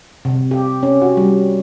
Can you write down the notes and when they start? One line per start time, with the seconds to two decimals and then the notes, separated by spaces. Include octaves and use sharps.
0.25 C3
0.51 G4
0.83 C#4
1.02 F#4
1.17 G3